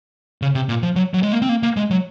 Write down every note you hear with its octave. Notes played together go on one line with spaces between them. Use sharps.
C#3
C3
A#2
F3
F#3
F#3
G#3
A#3
C4
A#3
A#3
G#3
F#3